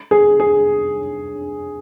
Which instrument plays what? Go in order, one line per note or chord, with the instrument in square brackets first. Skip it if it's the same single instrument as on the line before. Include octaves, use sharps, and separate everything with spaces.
[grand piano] G#4
G#4